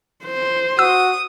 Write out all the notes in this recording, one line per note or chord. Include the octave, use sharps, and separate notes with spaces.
C5
F#4 D#6 E6